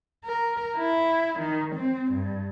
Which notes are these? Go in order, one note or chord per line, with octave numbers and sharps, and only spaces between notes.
A#4
E4
D#3
C4
G2